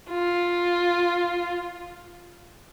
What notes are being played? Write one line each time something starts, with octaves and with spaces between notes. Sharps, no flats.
F4